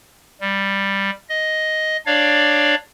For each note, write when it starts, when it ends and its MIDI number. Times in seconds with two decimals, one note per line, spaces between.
0.41 1.11 55
1.30 1.97 75
2.06 2.75 62
2.06 2.75 73
2.06 2.75 74
2.06 2.75 77